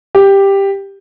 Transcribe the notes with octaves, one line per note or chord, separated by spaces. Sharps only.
G4